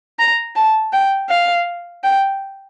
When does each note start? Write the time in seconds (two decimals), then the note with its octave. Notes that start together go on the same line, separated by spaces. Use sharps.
0.19 A#5
0.56 A5
0.93 G5
1.29 F5
2.04 G5